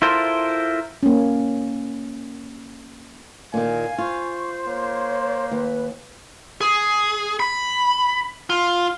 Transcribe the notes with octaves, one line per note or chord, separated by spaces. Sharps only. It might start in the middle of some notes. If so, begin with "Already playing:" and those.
E4 F4 A4 A#4 C5
A#3 C#4
A#2 D#3 F5 G#5
F4 C5 C#6
A#3 C#5
D#2 B4
G#4
B5
F4